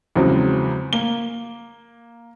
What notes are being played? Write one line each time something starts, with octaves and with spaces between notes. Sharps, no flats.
E2 C#3 F3 F#3 G#3 C4
A#3 G7